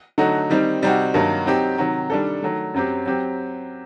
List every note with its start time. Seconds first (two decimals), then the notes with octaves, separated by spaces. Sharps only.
0.18 D3 F#3 A3 D#4 F#4
0.50 D#3 G3 C4 D#4
0.82 C3 G3 C4 D#4 F#4
1.14 G2 D#3 F#3 A#3 D#4
1.46 F#3 C4 D#4 G4
1.78 C3 D#3 F#3
2.10 D#3 G3 D4 A4
2.43 D#3 F#3 A3
2.74 F#2 F#3 C4 G4
3.06 F#3 C4 G4